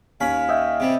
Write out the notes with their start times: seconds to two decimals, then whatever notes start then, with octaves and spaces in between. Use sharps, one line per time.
0.21 D#2 C#4 F5 B5
0.48 D#5 E5 G5
0.80 C3 G3